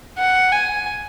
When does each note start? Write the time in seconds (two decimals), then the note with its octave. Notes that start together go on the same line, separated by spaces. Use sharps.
0.18 F#5
0.52 G#5